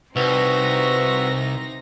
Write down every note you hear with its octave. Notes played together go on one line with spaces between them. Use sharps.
C2 C4 D#4 F#4 B4 E5 C#6 A#6